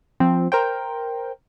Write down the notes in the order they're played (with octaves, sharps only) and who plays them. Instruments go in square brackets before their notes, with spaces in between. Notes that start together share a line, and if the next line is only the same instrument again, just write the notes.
[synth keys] F3 C4
A#4 C5 G5